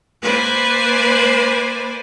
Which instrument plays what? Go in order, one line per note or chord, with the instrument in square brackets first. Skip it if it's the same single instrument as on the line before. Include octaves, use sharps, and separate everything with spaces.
[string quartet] A#3 B4 C5 D5 G#5 B5